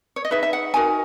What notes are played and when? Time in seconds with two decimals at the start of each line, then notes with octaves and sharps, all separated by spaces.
0.16 C#5
0.25 D#5
0.31 D#4 G#4 B4 E5
0.43 E5
0.53 F#5
0.74 D#4 F#4 A#4 G#5